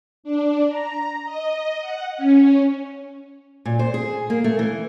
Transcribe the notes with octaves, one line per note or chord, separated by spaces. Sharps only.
D4
A#5
D#5
F#5
C#4
A#2
C5
G#4
A#3
A3
E3